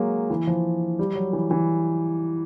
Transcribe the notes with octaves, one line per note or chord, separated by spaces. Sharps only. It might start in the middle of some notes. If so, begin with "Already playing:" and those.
Already playing: F#3 G#3 A#3
E3
F3
G3
F#3
E3
E3